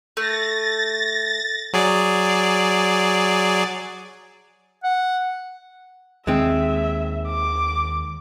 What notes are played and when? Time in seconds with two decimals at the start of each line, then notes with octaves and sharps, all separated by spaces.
0.17 A3 A6 A#6
1.73 F#3 G#4 D5
4.83 F#5
6.27 D#2 D#3 G#3 C4 E5
7.28 D6